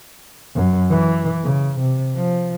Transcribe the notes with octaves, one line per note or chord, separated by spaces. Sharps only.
F#2
E3
C#3
C3
F3